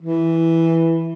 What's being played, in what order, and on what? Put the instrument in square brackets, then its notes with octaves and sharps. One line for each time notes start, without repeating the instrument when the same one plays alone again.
[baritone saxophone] E3